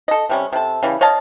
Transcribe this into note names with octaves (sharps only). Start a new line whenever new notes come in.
A4 D#5
C3 G3 C#4
C3 A4
C#3 E3 G3
C#5 D#5 F5 A5